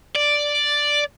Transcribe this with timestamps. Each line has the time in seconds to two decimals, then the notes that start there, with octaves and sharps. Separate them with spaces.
0.16 D5